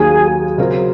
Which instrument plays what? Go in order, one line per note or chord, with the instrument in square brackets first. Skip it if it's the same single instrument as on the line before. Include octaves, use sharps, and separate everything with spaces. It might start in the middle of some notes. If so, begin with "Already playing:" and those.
Already playing: [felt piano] D#2 D#3 F#3 A#3 [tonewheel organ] G#4
[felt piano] C#3 F#3 C4 F4 A#4